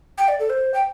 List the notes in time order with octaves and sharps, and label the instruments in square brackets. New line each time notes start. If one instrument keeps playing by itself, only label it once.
[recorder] G5
D5
A4
C5
G5